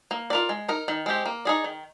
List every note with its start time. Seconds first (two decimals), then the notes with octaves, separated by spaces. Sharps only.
0.11 A#3
0.30 F4 A#4 D5
0.49 G#3
0.68 D#4 A#4
0.88 D#3
1.06 G#3 C4 G4
1.26 A#3
1.45 D#4 G#4 D5
1.64 D#3